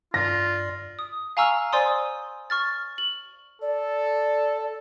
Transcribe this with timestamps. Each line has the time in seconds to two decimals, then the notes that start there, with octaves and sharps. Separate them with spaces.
0.14 G2 F4 D5 A#6
0.99 D#6
1.37 F5 G#5 A#5 C#6 E6 F6
1.73 C5 D5 G#5 C6 D#6
2.50 C#6 F6 A6
2.98 F#7
3.62 A4 D5